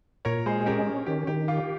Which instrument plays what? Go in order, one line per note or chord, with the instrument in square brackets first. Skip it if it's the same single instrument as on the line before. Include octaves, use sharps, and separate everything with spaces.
[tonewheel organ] A#2 [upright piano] A#4 C#5
[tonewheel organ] G#3 [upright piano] G#4 C5
[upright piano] G#4
[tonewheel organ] C#4 [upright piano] G4 A#4
[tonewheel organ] C#4
[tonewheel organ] D#3 [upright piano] G4
[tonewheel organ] D#3 [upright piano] G4
[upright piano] F4 [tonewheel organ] G4